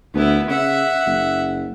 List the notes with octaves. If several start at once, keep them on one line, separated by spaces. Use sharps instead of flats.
D2 B3 E4
C#3 E5 F#5
F#1